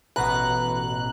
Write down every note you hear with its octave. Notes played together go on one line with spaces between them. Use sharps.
A1 B2 B4 F#5 A#5 F#6